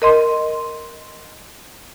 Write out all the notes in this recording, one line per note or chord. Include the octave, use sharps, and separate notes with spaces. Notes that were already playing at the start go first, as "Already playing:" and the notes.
A#4 D#5 C6